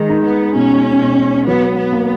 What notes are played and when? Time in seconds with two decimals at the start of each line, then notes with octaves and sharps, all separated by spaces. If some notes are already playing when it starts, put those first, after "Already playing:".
Already playing: D#3 G#3
0.10 D#4
0.25 B3
0.55 B2 C#4
1.01 B2
1.47 F#3 B3
1.78 B3
1.92 A#3